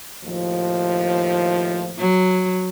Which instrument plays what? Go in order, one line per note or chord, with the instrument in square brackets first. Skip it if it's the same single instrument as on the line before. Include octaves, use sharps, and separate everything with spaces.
[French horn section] D#2 A2 F3
[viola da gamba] F#3